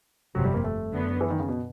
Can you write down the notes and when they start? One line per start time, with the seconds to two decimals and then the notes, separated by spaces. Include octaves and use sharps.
0.35 G1 F2 C3 F#3
0.45 G3
0.54 A#3
0.64 A3
0.93 F#2 D3 F#3 B3
1.21 E3
1.30 D#3
1.40 C#3
1.49 B2